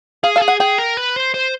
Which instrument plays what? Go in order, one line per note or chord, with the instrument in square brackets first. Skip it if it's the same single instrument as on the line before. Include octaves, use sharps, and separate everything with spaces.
[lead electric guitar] G#4 [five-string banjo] F5
[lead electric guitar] A4 [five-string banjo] F5
[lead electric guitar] G#4
[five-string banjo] F#5
[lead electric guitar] G#4 [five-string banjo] G5
[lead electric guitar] A#4
B4
C5
C5